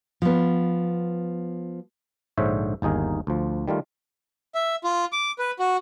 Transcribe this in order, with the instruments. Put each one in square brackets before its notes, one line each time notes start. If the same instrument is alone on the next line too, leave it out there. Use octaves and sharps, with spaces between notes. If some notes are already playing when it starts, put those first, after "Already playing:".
[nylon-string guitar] F3 B3
[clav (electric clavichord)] A#1 G#2 D3 C5 C#5 E5
G1 D#2 D#4 G#4 A#4
D2 F3
D#3 G3 A3 F4
[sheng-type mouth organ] E5
F4
D6
B4
F#4